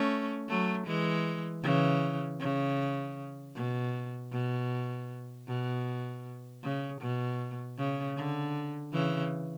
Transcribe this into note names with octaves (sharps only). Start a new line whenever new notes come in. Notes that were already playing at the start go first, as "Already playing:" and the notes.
Already playing: A3 C#4
F#3 A3
E3 G#3
C#3 E3
C#3
B2
B2
B2
C#3
B2
C#3
D3
C#3 E3